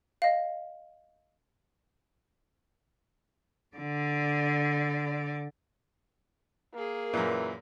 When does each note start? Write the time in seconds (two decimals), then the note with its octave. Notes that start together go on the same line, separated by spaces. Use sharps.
0.22 D#5 F5
3.76 D3 D5
6.74 A#3 G#4 A#4
7.13 F#2 A#2 E3